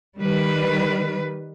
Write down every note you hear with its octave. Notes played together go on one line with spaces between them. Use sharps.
D#3 G3 B4